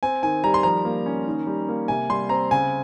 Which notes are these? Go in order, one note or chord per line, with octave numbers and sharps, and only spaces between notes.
C4 G#5
D#3 G#5
G3 A#5
C6
F3 A#5
A#3
C#4
D#3
G3
A#3
C3 G#5
G3 C6
C4 A#5
C#3 G#5